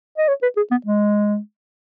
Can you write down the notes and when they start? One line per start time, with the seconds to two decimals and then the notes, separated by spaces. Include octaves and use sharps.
0.18 D#5
0.28 C#5
0.42 B4
0.57 G#4
0.71 B3
0.86 G#3